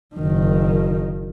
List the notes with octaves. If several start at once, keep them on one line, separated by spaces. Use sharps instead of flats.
F#1 D#3